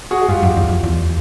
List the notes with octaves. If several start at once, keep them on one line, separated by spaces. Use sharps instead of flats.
F#4 G#4
G#4
G2 F4 G4
F#2
E2
F2
E2